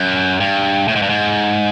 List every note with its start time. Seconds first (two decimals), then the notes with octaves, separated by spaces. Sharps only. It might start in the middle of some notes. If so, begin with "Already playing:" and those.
Already playing: F#2
0.40 G2
0.88 A2
0.95 G#2
1.02 G2
1.09 G#2